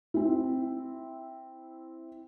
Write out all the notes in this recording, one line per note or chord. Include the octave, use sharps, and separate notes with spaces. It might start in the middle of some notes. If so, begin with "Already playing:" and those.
C4 E4